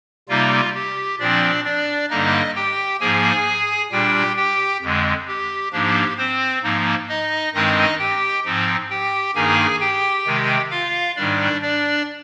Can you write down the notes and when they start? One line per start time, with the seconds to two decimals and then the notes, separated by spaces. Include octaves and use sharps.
0.29 C3 G3 A#3 D#4 F4
0.74 G4
1.19 A#2 F3 C4 D4 D5
1.65 D4 D5
2.10 G2 D3 G3 A#3 D#4 D#5
2.55 G4 G5
3.00 G#2 F3 A#3 G#4 G#5
3.91 A#2 G3 D4 G4 G5
4.36 G4 G5
4.82 F2 D3 G#3
5.27 G4
5.72 G#2 F3 A#3 D4 G4
6.18 C4 C5
6.63 G#2 F3 A#3 D#4
7.08 D#4 D#5
7.53 G2 D#3 G#3 C4 D#4 D#5
7.99 G4 G5
8.44 G#2 F3 C4 D#4
8.90 G4 G5
9.35 G2 D#3 A#3 D#4 G#4 G#5
9.80 G4 G5
10.26 C3 D#3 G#3
10.71 F4 F5
11.16 G#2 D#3 G3 D4 D5
11.62 D4 D5